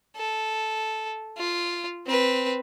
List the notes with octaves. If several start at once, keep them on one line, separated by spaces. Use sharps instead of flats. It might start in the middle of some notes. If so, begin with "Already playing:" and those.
A4
F4
C4 B4